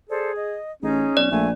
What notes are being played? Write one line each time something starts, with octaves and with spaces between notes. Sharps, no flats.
G#4 A4 C5 D5
D#5
A1 C#4 D#4 G#4
B1 D5
A#1 A3 G#5